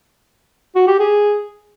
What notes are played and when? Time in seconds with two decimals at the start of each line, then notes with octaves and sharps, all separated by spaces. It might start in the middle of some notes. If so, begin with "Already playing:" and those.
0.76 F#4
0.88 G4
1.00 G#4